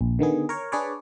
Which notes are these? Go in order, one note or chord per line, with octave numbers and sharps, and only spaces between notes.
A#1
D3 D#3 B3 G#4
A#4 C#5
D4 G#4 B4 C#5 D5